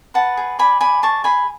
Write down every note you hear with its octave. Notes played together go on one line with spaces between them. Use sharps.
B4 F#5 A5
G#4
D5 G#5 B5
D5 G#5 B5
G#4 A5 C#6
G#4 G#5 B5